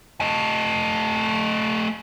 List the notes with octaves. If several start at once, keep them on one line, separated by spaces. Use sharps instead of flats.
A3 D#5